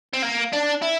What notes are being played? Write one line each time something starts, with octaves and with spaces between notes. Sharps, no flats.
C4
A#3
D4
E4